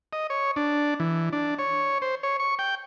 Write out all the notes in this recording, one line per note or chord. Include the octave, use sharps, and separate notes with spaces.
D#5
C#5
D4
E3
D4
C#5
C5
C#5
C#6
G5